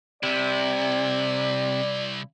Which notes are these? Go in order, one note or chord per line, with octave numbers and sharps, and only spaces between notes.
C2 C3 E4 D5